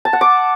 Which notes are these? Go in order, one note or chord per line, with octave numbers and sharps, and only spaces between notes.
A5
F#5
D6